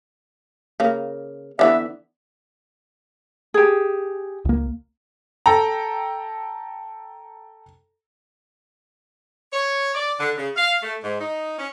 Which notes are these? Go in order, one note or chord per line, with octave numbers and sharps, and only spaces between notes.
C#3 A#3
D3 E3 B3 E5
G4 G#4
C#2 A#3
A4 G5 A#5
C#5
D5
D3
C#3
F5
A3
G#2
D#4
C#4